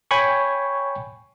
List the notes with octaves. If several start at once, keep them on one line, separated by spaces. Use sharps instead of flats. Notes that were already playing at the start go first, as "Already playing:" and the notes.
C#5 G5 G#5 B5 C#6